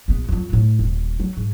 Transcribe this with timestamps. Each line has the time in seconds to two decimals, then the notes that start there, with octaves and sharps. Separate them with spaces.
0.08 A#1 B3
0.28 F2 F#3
0.53 A2
0.79 D#1
1.20 F#3
1.37 G#2